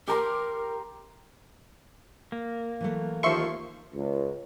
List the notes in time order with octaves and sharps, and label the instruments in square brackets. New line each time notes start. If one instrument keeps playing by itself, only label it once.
[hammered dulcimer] G4 A#5 C6 [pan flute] A#4
[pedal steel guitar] A#3
[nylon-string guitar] E3 F#3 A3
[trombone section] D#2 F3 [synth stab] E5 C6 C#6
[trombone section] C#2